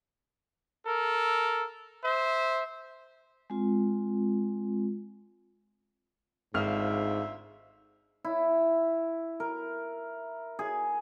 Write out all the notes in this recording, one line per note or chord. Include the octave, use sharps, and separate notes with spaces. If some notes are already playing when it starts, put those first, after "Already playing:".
A4 A#4
C5 E5
G#3 C4 F4
G#1 D2 G#2 F4 E5 F6
E4
A#4
G#4